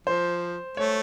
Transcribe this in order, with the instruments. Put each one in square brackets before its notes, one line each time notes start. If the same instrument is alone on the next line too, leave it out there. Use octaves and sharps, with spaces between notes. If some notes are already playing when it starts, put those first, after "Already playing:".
[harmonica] F3 [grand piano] C5
[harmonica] A3 [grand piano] C#5